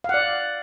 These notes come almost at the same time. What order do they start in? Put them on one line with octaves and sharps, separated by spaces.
F5 F#5 D5